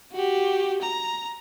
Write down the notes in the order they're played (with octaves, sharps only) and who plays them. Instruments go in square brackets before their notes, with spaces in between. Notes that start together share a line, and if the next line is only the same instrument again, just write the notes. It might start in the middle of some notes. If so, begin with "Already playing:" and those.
[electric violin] F#4 G4
A#5